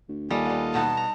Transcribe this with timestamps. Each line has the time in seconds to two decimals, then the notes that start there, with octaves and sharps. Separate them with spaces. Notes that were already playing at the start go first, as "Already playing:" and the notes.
0.09 D2
0.31 D#2 G3 F4 A4 D#5 G#5
0.45 G3 B3
0.74 B2 B3 D#4 A5
0.97 A#5